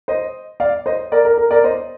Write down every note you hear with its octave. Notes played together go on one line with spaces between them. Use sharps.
C5 D#5
D5 F5
C5 D#5
A#4 D5
A#4
A#4
A#4 D5
C5 D#5